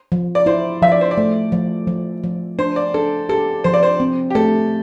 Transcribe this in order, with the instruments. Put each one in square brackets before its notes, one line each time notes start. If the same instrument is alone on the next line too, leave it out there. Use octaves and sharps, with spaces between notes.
[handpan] F3
[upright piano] D5
[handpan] E4 [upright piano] C5
[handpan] F3 [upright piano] E5
[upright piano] D5
C5
D5
[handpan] A3
F3
F3
F3
[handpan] D4 [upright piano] C5
[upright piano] D5
[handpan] D4 [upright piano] A4
[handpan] G4 [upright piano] A4
[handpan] F3 [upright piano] C5
[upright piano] D5
C5
[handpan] C4
[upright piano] G4
[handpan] A3 [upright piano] A4